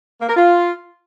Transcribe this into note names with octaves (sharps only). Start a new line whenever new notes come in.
A#3
A#4
F4